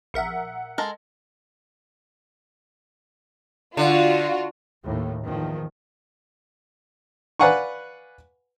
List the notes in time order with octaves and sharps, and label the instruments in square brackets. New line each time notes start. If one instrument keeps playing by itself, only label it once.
[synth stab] A#1 A#4 E5 [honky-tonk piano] F#5 C#7
[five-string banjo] G#3 A4 A#4
[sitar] D3 [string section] F4 F#4
[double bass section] D#2 A2
E2 D#3 F3
[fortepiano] B4 D5 F5 F#5 G#5 C#6